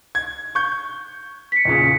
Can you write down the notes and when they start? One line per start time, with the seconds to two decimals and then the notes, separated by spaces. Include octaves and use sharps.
0.15 G#6
0.55 C#6 G6
1.52 B6 C#7
1.65 E2 A#2 C#3